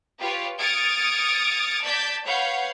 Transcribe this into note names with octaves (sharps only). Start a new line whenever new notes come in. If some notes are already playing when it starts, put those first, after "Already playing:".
F4 G4 B4 C#5
D#6 F6 G#6 A6 C#7 D7
D5 A5 D6 G6 G#6 B6
B4 C#5 F5 F#5 B5 G6